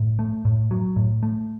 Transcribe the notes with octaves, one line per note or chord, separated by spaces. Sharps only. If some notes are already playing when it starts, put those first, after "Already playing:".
Already playing: A2
A3
A2
F#3
A2
A3